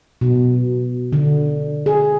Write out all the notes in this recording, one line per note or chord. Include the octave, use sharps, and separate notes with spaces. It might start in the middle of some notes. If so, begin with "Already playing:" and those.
B2
D3
G#4